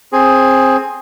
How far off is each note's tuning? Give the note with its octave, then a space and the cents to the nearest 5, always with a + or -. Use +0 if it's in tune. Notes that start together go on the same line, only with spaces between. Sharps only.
C4 +15 G#4 +5